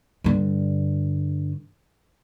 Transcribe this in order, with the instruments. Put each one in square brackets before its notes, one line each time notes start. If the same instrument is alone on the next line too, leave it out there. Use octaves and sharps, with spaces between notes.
[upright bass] G2 D3